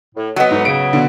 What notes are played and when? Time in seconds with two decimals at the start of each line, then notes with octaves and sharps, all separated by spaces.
0.15 A2
0.36 F#3 B3 D#5
0.51 D2 G#2 E3 D#4
0.65 C#3 D7
0.93 B2 D3